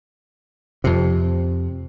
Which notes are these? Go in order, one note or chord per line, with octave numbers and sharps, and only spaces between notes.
F2 C3